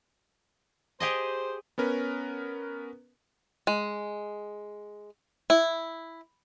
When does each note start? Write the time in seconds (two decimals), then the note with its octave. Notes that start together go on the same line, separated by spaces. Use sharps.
1.00 G4 G#4 C5 D#5
1.78 B3 C#4 A#4 B4
3.67 G#3
5.50 E4